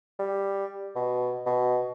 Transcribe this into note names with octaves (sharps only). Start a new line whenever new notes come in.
G3
B2
B2